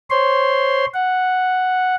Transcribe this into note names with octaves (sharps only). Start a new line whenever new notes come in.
C5 C#5 C6
F#5